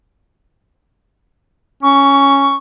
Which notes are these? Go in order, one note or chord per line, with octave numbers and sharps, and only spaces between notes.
C#4 C#6